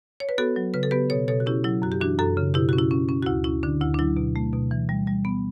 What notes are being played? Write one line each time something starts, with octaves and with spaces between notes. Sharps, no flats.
C#5
B4
B3 F#4 A4
F#3
C#3 B4
A4
B3 G4 B4
B2 A4 C#5
B2 A4 C#5
F#4
C#4 E4 G4
F#3 E4
F#2 F#4
G4
E3 D4 F#4
F#2 F#4 A4
C#3
B2 E4 G4
C#4 F#4
E4
C#4
C#4
F#4
D2 E4
C#4 E4
D3 D4
D2 E4
D4
F#3 E4
B2
A3
B2
E3
G3
G3
B3